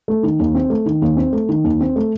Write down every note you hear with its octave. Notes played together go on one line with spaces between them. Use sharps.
A3
D#3
D#2
C4
A3
D#3
D#2
C4
A3
D#3
D#2
C4
A3